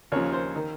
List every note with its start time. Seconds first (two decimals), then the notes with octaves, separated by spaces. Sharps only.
0.12 D#2 C#3 F3 C#5
0.33 C5
0.56 D#3